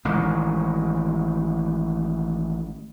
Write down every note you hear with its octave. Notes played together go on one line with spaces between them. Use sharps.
A1 D#3 G#3